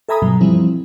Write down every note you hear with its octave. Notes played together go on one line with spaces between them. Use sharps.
A4 E5 G#5 A#5 B5 D#6
G2 B2 F#3
E3 F3 G3 C4 E4